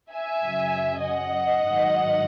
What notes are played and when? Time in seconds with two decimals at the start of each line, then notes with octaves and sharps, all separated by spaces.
0.12 E5 G#5
0.41 F#2 C#3 F#3
1.02 D#5 F#5
1.63 G#2 D#3 F#3